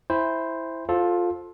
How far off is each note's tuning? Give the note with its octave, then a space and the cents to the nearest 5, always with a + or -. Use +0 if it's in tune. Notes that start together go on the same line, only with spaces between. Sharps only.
E4 +0 C5 +0 G5 +40
F4 +15 A4 -10 C5 +0